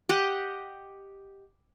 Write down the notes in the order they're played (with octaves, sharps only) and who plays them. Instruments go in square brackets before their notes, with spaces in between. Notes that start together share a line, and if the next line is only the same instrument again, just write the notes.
[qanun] G4 D#5 F#5